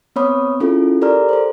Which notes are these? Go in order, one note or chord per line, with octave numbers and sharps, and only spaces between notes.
B3 C4 C#5 B5 D#6
C#4 E4 F4 G#4 A4
G4 A4 A#4 D5 A#5 F6
A4 C5